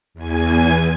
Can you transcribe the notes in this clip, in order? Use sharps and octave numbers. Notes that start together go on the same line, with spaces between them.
E2 G#5